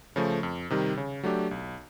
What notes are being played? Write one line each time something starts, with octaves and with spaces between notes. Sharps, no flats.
C#3 F3 A3
F2
C3 D#3 G3
C#3
F#3 A3 D4 G4
B1